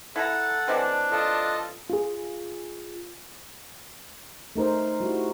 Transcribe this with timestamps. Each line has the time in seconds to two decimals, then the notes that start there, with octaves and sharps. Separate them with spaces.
0.16 E4 A4 F#5 A#5
0.68 E3 G#3 C4 D4
1.11 F4 A4 D#5
1.90 F4 G#4
4.56 A3 D#4 A#4 C5
5.00 G3 E4 F#4